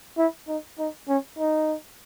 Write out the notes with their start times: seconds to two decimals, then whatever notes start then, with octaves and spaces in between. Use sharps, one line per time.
0.18 E4
0.48 D#4
0.79 D#4
1.09 C#4
1.39 D#4